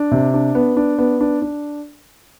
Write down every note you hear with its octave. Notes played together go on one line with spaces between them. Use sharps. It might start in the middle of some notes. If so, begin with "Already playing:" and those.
Already playing: D4
C3
D4
B3
D4
B3
D4
D4